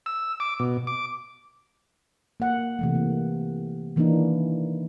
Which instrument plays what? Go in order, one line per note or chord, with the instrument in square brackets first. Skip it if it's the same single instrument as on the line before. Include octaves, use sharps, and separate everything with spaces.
[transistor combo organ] E6
D6
B2
D6
[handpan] A#3 F#5
C3 E3 A3
A#3
D#3 E3 A#3 D4 D#4